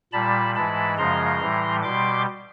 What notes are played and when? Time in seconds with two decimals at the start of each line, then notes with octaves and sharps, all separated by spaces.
0.13 A#2 G3 A5 B5
0.55 G#2 E3 G#3 A5 B5
0.98 F#2 C#3 F3 G#3 A#5 C6
1.41 A2 E3 G3
1.83 B2 G3 C6 D6